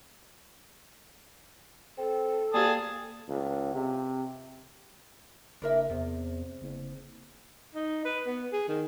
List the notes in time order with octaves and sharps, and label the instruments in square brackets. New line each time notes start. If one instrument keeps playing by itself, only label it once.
[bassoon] C4 [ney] A4
[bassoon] G3 [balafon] A#3 G4 F5 [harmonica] G#5 A5 D#6
[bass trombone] C#2
C3
[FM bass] F#1 [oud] D4 A#4 E5
[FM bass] E2 [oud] C3
[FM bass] F#1
[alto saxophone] D#4
B4
B3
G#4
D#3